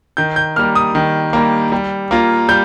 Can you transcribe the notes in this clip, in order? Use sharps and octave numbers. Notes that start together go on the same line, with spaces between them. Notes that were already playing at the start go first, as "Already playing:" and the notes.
D#3 G6
G6
G3 A#3 F6
D#6
D#3
G3 A#3
G3
A#3 F4
G3 G6